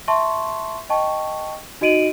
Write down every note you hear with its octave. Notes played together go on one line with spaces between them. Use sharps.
E5 A5 C6 C#6
D#5 G5 A5 C#6
D#4 F#4 D#5 D7 D#7 F#7